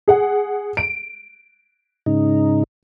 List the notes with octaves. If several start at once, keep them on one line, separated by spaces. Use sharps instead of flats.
G#4 F#5
D7
G#2 C#3 D#4